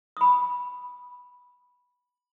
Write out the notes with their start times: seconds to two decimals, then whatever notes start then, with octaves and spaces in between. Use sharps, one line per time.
0.17 B5 D#6